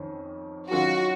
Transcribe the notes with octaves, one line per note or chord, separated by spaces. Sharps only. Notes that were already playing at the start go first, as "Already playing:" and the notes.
Already playing: F2 D#3 C#4
D#3 F#3 C#4 F4 F#4